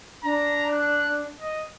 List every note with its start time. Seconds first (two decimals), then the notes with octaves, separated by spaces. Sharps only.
0.24 D4 A#5
0.70 F#6
1.40 D#5